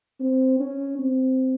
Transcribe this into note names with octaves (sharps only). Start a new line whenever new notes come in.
C4
C#4
C4